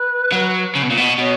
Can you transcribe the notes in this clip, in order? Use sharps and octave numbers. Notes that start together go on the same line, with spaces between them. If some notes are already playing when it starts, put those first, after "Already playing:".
Already playing: B4
F#3
C#3
B2
A#2
B2
B2 C#5